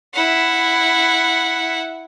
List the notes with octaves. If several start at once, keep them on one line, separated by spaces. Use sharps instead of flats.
E4 F#5